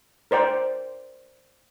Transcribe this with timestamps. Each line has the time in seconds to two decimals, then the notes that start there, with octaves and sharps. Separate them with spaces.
0.31 A#4 C5 D5 G5